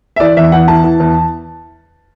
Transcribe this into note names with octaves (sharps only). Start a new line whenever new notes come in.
E5
E3 D5
E2 E5
E2 F#5
E3 A5
E3
E2